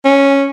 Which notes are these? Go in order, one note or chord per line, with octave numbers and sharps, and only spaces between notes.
C#4